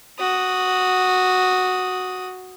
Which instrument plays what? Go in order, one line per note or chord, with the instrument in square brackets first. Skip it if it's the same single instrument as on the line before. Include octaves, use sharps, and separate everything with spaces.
[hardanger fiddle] F#4 D#6